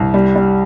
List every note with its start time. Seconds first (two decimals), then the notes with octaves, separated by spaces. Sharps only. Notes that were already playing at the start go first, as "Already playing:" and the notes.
Already playing: C2
0.14 G3
0.36 G3